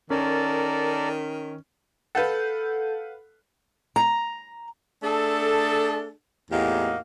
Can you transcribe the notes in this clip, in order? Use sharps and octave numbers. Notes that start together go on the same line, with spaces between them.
D#3 C#4 A4 A#4 D5
A4 B4 F5 F#5 G6
A#5
A3 D4 G#4 A4
E2 A2 A#3 D#4 F#4 G4